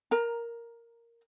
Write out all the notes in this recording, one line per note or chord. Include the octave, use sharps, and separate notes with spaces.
A#4 A#5